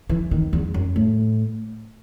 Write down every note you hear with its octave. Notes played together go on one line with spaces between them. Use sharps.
E3
D#3
E2
F#2
A2